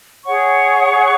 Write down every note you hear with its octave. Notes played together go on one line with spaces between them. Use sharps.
G#4 C#5 F#5 C#6